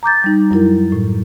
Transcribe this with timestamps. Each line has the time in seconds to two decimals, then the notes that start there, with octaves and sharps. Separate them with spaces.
0.03 A#5 D6 G6 A6
0.24 G3 D#4
0.51 F#2 F#3 E4 A#4
0.92 A2